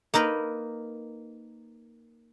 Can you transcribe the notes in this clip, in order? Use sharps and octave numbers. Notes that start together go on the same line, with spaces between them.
A#3 D#4 A#4 B4